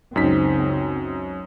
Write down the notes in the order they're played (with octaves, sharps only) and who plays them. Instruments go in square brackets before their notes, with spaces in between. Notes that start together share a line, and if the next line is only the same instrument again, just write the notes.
[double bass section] C#2 C4 [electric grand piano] F#2 D#4 B6